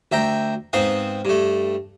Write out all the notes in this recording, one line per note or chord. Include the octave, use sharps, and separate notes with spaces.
D2 E5 G5 A#5
G#2 B3 C4 F5 D#6
G2 A3